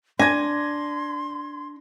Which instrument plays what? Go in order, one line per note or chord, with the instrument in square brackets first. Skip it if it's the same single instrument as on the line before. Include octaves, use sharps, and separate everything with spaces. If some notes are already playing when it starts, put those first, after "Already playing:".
[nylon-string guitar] D4 [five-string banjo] G#5 [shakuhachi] C6 [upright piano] G#6 A#6